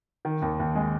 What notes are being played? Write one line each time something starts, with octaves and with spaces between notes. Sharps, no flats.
D#3
D#2
D#2
G#3